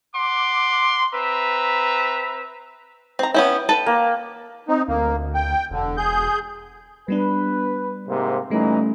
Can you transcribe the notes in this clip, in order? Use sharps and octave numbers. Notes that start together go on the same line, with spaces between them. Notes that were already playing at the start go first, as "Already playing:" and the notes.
F#5 C6 D6
C4 B4 E5 A#5
C4 A#5
B3 C#4 E4 G5
A4 B4 A5
A#3
C4 D#4
D2 A#3
G5
E1 D3
G#4 G6
G3 B3 D4 B4
G#2 C3 A#3
A#2 E3 G3 A3 C#4 D#4